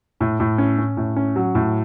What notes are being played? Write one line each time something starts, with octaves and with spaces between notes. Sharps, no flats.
A2
A2
C#4
C#4
A2
C#4
F#3
A2